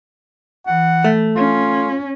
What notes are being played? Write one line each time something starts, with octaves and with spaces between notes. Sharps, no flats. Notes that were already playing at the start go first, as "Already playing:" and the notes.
E3 F#5
A3
C#4 F4